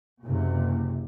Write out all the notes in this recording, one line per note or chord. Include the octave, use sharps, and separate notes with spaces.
F#1 C3